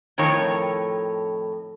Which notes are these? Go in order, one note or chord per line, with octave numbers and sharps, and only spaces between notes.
F2 A2 D#3 A#4 C#5